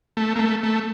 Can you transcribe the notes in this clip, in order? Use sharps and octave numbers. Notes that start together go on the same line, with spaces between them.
A3
A#3
A3
A3